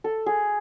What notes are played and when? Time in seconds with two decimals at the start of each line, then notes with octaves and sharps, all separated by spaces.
0.04 A4
0.26 G#4